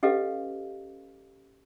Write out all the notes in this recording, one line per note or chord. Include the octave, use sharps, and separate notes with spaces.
C#4 G4 A4 B4 D#5 F5